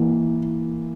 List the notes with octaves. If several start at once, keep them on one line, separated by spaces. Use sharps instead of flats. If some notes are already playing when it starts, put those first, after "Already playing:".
Already playing: E3 A#3